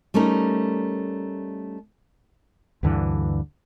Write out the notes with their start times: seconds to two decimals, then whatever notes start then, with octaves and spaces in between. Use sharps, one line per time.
0.14 G3 A3 C#4 D#4 A#4
2.83 D2 G2 D3 E3